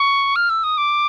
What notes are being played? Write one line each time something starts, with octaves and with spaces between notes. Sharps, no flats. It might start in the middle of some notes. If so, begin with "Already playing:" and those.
Already playing: C#6
F6
E6
D#6
D6